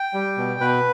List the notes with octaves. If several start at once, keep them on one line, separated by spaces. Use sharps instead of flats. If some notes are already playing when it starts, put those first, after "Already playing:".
Already playing: G5
G3
B2
B2 B4